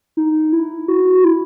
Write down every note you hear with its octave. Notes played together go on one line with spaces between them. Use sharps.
D#4
E4
F#4
E4